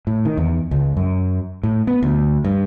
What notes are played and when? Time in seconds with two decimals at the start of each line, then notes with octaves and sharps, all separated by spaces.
0.07 A2
0.25 D#3
0.37 E2
0.71 C#2
0.97 F#2
1.63 A2
1.87 B3
2.03 D2
2.45 G2